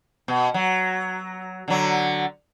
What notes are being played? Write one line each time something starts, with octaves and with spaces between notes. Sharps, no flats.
B2
F#3
D3 F#3